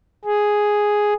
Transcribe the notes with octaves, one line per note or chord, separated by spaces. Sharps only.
G#4